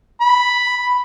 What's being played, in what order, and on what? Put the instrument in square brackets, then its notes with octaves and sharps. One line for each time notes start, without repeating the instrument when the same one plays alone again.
[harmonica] B5